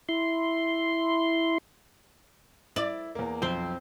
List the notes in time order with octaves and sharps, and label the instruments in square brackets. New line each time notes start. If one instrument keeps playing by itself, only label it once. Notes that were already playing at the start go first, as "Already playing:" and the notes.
[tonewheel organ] E4 C6
[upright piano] E4 [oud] D5
[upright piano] E2 A#3
[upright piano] B1 F2 [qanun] C4 C5